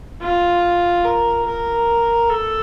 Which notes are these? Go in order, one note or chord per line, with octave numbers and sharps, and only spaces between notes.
F4
A#4
A#4
A4